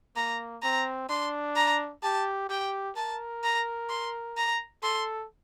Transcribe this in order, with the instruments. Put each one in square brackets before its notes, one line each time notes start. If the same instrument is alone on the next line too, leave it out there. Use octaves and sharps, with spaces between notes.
[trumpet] A#3 [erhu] A#5
[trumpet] C4 [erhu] A#5
[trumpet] D4 [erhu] C6
[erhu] A#5
[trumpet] G4 [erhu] A5
[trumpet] G4 [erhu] G5
[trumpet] A#4 [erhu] A5
[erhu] A#5
C6
A#5
[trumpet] A4 [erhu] C6